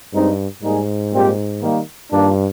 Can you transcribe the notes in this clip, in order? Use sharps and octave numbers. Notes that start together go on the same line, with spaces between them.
G2 G#3 C4 D#4
G#2 G3 A#3 D#4 G#4
A#2 G3 C4 D#4 G4
D#3 G3 A#3
G2 D#3 A#3 D4 F4 A#4